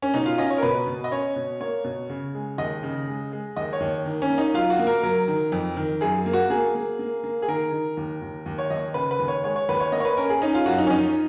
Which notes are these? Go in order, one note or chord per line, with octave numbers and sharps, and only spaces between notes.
C#4
B2 D#4
F4
C#4 D#5
C#5
A#4
B2 B4
B2
D#5
C#4 C#5
B2
A#3 C#5
B2
C#3
G#3
D#2 D#5
C#3
G#3
G#3
D#2 D#5
C#5
D#2
D#3
C#4
A#3
D#4
F#3 F4
F#4
A#3
A#4
F#3 A#4
D#3
F2
D#3
F#2 G#4
A#3
F#4
A#3 G#4
A#3
A#3
A#3
G#4
D#3 A#4
D#3
D#2
D#2
D#2
C#5
D#2 D#5
C#3 B4
B4
D#2
C#5
G#3 C#5
C#5
D#2 B4
C#5
A#3 D#5
C#5
B4
C#4 A#4
G#4
C#4 D#4
F4
F#2 F#4
D#4
C#4
F3 D#4